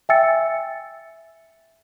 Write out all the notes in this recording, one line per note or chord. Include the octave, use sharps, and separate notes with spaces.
E5 G5 G#5 E6 A6 C#7